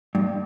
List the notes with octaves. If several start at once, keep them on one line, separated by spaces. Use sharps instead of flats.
G2